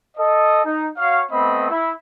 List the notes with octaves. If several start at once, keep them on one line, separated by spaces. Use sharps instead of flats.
A4 D#5
D#4
F#4 C#5 F5
A3 B3 C4 D#5 B5
E4